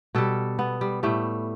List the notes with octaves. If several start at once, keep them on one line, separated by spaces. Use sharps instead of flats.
B2 G3 A4
B3
G3
A2 G3 A3